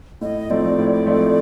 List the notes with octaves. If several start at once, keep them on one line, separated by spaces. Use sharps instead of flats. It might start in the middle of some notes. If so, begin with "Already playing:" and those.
A2 D#5
F3 A3 C4 D#4 D5
A2
F3 A3 C4 D#4